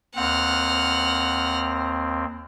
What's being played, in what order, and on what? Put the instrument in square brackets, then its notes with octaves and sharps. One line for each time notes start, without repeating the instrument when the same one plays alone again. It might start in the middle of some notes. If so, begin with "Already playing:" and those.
[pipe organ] D#2 C4 [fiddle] F#5 F6